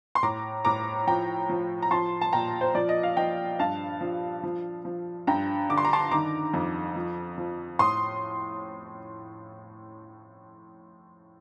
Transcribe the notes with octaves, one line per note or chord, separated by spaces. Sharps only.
C6
A2 A#5 D6
A2 A#5 D6
F3 G5 A#5
F3
A#5
F3 A5 C6
A5
A#2 G5 A#5
C5
F3 D5
D#5
F5
F3 D#5 G5
G2 F5 A5
F3
F3
F3
G2 G5 A#5
D3 D6
C6
A#5
A5 C6
D#3 A#5 D6
F2
F3
F3
A2 C6 D#6